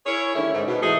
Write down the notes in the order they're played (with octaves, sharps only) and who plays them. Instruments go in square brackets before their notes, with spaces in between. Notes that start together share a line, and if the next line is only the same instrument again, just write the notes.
[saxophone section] E4 G#4 A#4 C#5
D3 D#3 G3 A3 C#4 E4
G#2
B2
G#2 E3 A3 D#4 G#4